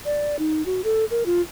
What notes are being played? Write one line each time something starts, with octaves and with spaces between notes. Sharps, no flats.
D5
D#4
F#4
A4
A#4
F4